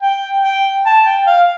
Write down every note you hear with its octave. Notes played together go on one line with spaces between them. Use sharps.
G5
G5
A5
G5
F5